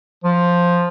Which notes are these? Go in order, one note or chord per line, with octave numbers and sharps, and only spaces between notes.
F3